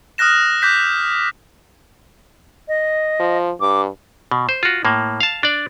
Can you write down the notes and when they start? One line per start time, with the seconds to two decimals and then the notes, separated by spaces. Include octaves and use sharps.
0.18 D#6 F6 F#6 A#6 E7
0.62 D6 F#6 G6 B6
2.68 D#5
3.19 F3
3.61 G2 D6
4.31 B2
4.49 C5
4.63 F4 F#4
4.85 A2 A#3
5.21 F5 A5
5.43 D4 D5